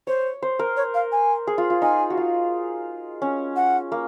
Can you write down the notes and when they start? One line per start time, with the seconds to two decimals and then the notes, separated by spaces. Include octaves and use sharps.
0.07 C5 C#5
0.42 C5
0.59 A#4
0.77 C#5
0.94 F5
1.12 G#5
1.47 G#4
1.58 F4
1.70 F4
1.82 D#4 G#5
2.10 F#4
2.17 F4
3.22 C#4
3.56 F#5
3.92 A#3